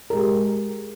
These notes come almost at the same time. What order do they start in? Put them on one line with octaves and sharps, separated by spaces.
A#4 G#3 G4